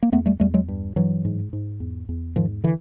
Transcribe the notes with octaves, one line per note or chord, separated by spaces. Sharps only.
A#3
E2 A3 B3
G3 A3
E2 G3 A3
F#3 G#3
G2
G2 E3 F#3
G#2
G#2
E2
E2
G#2 D#3 F3
D3 E3